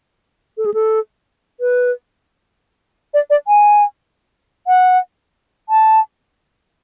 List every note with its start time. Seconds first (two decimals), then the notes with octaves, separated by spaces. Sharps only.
0.57 A4
0.66 G#4
0.74 A4
1.60 B4
3.14 D5
3.30 D5
3.48 G#5
4.67 F#5
5.69 A5